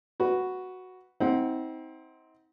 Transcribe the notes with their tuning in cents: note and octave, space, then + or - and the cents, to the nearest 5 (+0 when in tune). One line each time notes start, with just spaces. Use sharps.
F#4 +0 B4 +0
C4 +0 D#4 +45 F#5 +0